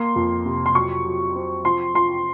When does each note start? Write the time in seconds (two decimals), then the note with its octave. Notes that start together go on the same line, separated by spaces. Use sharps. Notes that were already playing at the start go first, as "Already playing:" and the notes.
Already playing: A#3 C6
0.16 F2
0.45 C3
0.66 C6
0.75 F#3 C#6
1.06 F#3
1.35 C4
1.65 F3 C6
1.95 F3 C6